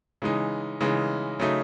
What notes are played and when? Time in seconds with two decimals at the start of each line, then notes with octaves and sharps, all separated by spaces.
0.22 C#3 E3 G#3 D#4
0.81 C#3 E3 G#3 D#4
1.40 C#3 F#3 A3 D#4